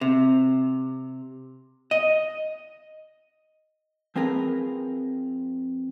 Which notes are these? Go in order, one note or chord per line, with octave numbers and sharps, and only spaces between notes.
C3
D#5
F3 C4 G#4 A#4 B4